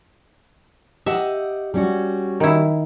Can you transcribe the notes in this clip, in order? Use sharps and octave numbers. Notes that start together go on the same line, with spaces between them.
G4 D#5 E5 F#5
G3 C#4 F#4
D#3 E4